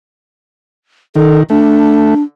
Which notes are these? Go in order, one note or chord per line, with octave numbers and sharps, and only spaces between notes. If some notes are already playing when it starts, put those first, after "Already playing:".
D#3 A4
A3 D4